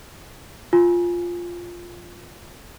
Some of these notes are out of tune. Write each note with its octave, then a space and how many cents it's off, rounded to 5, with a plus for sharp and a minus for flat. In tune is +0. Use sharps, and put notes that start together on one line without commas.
F4 +0 G#5 +0